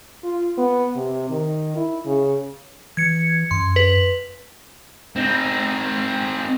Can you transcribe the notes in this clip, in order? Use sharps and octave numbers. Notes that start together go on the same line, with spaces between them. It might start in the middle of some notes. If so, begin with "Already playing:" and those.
F4
B3
C3
D#3
E4
C#3
E3 G#6 C#7
F#2 C6
B4
C4 D#4